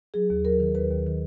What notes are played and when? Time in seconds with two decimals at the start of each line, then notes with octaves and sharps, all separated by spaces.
0.14 F#3 G#4
0.30 D#2
0.45 F#3 A#4
0.60 D#3
0.75 D#2 B4
0.90 D#2
1.06 D#3